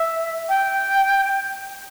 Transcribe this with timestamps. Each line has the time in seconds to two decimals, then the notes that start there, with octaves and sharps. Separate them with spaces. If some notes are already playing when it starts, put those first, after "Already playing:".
Already playing: E5
0.49 G5